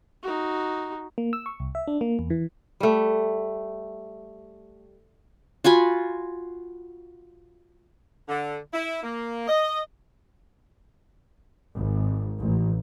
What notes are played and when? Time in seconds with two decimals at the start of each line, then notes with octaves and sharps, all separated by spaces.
0.23 D#4 F#4
1.18 A#3
1.33 E6
1.46 C#6
1.60 C2
1.75 E5
1.87 D4
2.01 A#3
2.19 E2
2.30 E3
2.80 G3 A3
5.64 F4 F#4 G#5 B5
8.29 D3
8.73 E4
9.03 A#3
9.48 D#5
11.75 G#1
12.39 A1